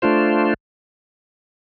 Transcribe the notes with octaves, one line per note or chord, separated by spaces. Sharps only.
A3 D4 F4 C5